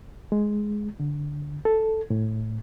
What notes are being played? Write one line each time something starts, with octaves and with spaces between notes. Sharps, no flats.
G#3
D3
A4
A2